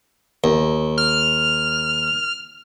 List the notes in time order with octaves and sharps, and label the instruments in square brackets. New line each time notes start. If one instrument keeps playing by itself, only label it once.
[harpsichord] D#2
[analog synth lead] F6